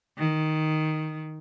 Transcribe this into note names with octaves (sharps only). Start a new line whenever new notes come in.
D#3